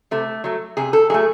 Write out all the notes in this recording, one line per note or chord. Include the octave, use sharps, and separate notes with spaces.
C3 A3
F#3 A3
C3 G#4
A4
F#3 A3 G#4